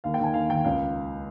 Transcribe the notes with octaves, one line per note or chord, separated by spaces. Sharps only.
D#2 F5
G5
D#3 G#5
D#2 F5
D#3 G5
C#2 F5